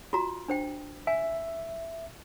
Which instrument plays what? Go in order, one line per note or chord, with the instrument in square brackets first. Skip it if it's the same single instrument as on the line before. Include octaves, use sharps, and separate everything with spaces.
[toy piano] F4 F#4 A#5
D4 C5 G5
[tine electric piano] E5 [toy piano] G#5